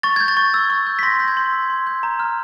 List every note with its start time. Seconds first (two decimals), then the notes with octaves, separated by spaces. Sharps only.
0.03 C#6 A6
0.16 G6 G#6
0.28 A6
0.37 C#6
0.54 E6
0.70 C#6
0.87 G6
0.99 B6
1.03 C6 A#6
1.20 G6
1.28 G#6
1.37 C6
1.53 E6
1.70 C6
1.87 G6
2.03 A#5
2.20 F6